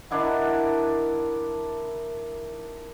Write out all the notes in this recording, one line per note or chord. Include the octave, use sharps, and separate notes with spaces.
D#3 D4 E4 F#5